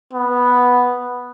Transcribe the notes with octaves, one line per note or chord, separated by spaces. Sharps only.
B3